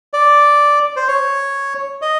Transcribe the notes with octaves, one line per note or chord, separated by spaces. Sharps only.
D5
C5
C#5
D#5